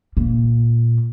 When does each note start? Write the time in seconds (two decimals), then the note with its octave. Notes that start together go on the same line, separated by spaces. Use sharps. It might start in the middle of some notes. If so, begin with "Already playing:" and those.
0.17 A#2